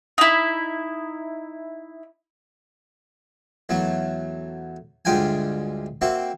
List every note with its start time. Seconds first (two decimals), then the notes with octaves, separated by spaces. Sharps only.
0.18 D#4 E4
3.69 E2 F#3 A3
5.05 D2 G2 G#3 F4 G5 G#5
6.01 A#3 C4 F#4 E5